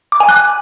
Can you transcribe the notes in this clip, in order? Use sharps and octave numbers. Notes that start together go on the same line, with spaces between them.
D6
G#5
F#6